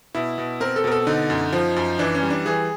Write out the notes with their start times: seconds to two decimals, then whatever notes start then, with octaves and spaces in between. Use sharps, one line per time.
0.14 B2 E4
0.38 B2
0.60 C4 A#4
0.76 A4
0.84 B2 A#4
0.92 A4
1.07 D3 D#4
1.30 F#2
1.53 F3
1.76 F#2
1.99 E3 D4
2.15 C#4
2.23 G3
2.30 D4
2.46 E3 G#4